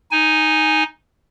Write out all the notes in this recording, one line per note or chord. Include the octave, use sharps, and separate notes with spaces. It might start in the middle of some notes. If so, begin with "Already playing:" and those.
D#4 G#5